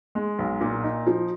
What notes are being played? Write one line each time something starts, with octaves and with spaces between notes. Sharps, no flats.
G#3
B1
A#2
D#4
F3